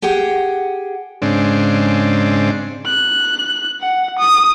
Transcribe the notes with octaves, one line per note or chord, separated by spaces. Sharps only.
G4 G#4 F#5 G5
G#2 C#3 C4 D4
F#6
F#5
D#6